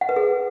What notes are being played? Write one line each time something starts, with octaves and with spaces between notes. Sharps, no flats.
F#5
B4
G#4